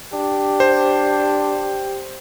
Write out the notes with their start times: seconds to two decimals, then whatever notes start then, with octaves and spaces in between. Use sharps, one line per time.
0.13 D4 G4
0.60 C5